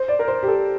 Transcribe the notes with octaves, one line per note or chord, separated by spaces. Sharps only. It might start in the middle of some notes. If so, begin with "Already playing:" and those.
Already playing: C5
D5
A#4
C5
G4
A4